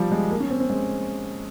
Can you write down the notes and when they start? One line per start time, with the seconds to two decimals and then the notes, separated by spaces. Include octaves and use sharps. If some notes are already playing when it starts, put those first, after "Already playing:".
Already playing: F3 G3
0.12 G#3
0.31 A#3
0.40 C#4
0.50 C4
0.60 C4
0.70 G#3